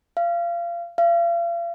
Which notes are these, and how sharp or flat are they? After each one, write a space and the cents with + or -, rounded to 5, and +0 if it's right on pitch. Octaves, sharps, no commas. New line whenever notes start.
F5 -25
F5 -40